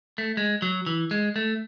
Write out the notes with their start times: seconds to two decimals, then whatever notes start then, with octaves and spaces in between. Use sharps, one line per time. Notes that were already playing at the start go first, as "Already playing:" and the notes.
0.18 A3
0.37 G#3
0.62 F#3
0.86 E3
1.11 G#3
1.36 A3